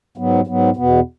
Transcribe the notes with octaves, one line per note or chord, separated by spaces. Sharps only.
G#2 F#3 B3
G#2 F#3 B3
E2 B2 B3